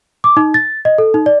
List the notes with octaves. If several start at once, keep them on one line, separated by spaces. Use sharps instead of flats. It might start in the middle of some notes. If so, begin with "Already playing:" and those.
D6
D#4
A6
D#5
A4
D#4
D5